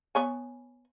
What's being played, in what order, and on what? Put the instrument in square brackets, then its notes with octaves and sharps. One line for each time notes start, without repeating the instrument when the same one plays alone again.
[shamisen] B3 C#5 G#5